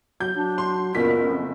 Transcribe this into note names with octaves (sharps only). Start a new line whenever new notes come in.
F#3 G6
F#3 D4
C6
F#1 A#2 B3 A#4 B6
F2